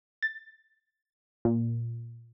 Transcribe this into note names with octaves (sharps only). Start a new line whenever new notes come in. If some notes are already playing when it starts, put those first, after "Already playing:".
A6
A#2